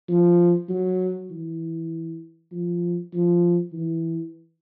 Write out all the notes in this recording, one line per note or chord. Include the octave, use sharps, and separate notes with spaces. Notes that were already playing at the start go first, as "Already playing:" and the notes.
F3
F#3
E3
F3
F3
E3